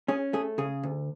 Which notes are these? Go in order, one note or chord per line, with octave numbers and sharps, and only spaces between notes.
C#4 G#4
A3 G#4
C#3 G#4
D2